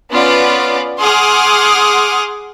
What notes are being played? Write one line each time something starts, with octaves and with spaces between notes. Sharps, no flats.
B3 C#4 F4 D5
G#4 F#5 C6 D6 D#6 F6